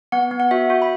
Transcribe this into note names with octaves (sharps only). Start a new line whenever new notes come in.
B3 F#5
B3
F#5
F#4 E5
F#4
B5